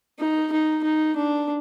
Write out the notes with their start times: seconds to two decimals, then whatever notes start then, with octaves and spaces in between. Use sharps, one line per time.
0.19 D#4
0.52 D#4
0.84 D#4
1.16 D4